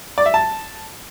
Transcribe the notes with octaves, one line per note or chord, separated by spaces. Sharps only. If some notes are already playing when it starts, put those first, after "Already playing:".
D5
E5
A5